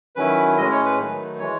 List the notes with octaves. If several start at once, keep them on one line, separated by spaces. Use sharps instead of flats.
D#3 F#3 C#4 E4 B4
A2 G#3 C#4 D#5
C#5
B4
D#3 F#3 A3 D#4
E3 G#3 C#5